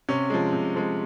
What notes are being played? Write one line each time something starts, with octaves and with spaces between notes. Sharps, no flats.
C3 C#4
F3 G#3
C3
F3 G#3